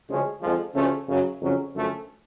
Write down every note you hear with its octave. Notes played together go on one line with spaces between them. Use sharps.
D2 C#3 F3 G#3 C#4
F2 D3 F3 G#3
D2 C#3 F3 A3 C#4
F#2 C#3 F#3
F2 C#3 F#3 C#4
F#2 D3 F3 A3 C#4